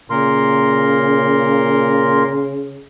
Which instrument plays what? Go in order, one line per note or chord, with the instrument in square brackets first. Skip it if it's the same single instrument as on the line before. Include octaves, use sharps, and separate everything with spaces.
[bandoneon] A#2 A#4 C6 [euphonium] C#3